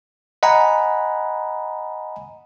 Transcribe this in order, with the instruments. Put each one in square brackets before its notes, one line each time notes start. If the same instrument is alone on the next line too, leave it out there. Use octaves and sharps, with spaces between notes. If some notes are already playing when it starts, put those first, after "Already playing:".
[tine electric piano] D#5 F#5 G#5 A#5 B5